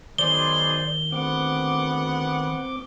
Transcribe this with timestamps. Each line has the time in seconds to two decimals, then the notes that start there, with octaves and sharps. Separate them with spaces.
0.18 B1 D#3 G#4 C5 D5 G7
1.12 D2 B3 C4 F#5 D6